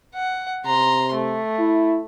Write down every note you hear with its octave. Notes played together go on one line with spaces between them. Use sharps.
F#5
C3 A#5 C6
A3
E4